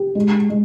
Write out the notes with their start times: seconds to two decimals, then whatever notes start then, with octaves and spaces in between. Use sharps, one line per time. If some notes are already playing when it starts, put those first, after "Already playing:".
Already playing: G4
0.15 G#3
0.50 G#3